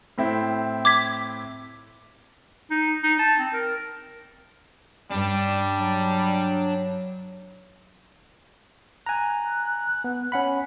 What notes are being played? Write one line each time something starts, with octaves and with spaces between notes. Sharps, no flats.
A2 C4 E4
D6 G#6 B6
D#4
D#4
A5
C4
A#4
G2 G3 C#4 D4
F#3
G#5 A#5 F#6
B3
C#4 F#5 B5